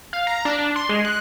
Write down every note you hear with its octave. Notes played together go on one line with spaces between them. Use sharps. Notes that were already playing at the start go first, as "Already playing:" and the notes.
F5
A#5
D4
D4
C6
G#3
F#6